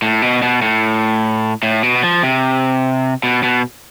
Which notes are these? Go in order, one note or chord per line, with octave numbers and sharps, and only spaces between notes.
A2
B2
B2
A2
A2
B2
F3
C3
B2
B2